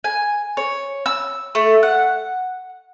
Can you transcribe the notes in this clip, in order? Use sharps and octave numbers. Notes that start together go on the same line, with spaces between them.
G#5
C#5
E6
A3
F#5